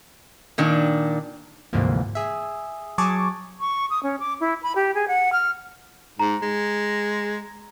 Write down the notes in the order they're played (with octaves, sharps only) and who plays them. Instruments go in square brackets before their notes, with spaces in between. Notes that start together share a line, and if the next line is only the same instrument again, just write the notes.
[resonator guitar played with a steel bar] A#2 D#3 D4
[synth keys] D2 G#2 C3 E3 F3 A#3
G#4 E5
F#3 G#4 G#5 A5 C#6 D6
[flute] C#6
D#6
C#4
D6
E4
B5
G4
G#4
F#5
F6
[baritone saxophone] G#2 [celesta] A#5
[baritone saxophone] G#3